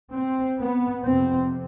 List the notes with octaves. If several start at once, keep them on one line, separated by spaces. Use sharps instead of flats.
C4
B3
F2 C3 C4